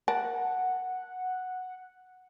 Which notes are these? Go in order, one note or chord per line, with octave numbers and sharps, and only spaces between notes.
A#4 F#5 A5